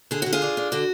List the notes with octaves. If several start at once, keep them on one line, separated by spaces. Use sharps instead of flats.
D3 G#4
D3 F#4
F4 G#4
D4
D4
D3 F#4